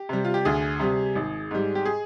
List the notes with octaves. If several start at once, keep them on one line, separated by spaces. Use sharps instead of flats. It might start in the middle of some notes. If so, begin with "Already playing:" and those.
Already playing: G4
C3 G3
F4
G4
D2 G#4
C3 G3
G#1
G#2 G3
G4
G#4